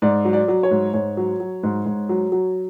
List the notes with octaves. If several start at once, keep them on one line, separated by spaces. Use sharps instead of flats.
G#2 D5
F#3
D5
F#3
C#5
G#2
G#2 C#5
F#3
F#3
G#2
G#2
F#3
F#3